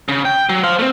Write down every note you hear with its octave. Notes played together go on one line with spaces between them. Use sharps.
C#3
G5
F#3
C5 F5
A3 C4